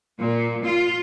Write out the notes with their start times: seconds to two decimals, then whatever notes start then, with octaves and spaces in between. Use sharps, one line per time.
0.19 A#2
0.63 F4